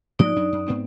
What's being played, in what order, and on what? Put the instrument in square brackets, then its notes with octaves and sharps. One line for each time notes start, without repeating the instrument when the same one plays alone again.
[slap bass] G#2 F3 A#3 [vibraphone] D#4 D5
[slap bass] F#2 F#3 D4
F#2
G#2 B3 C4